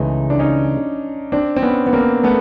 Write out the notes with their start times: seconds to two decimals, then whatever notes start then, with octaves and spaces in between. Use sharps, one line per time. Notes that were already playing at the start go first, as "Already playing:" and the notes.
Already playing: C#2 C#3 E3 A3 D#4
0.30 D4
0.39 C#4 D#4
1.32 C4 D4
1.56 C4
1.62 B3 C#4
1.87 B3
1.93 A#3 C4
2.24 A3 B3